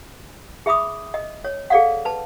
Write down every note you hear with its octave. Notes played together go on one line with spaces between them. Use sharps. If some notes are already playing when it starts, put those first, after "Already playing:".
G#4 E5 B5 D6 D#6
D#5
C#5
G#4 A4 D5 F5 F#5
B4 A5